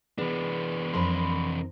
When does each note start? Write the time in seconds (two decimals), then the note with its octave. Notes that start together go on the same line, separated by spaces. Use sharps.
0.18 E3 B3 D4 G#4 B4
0.94 F2 A#4 B5 C6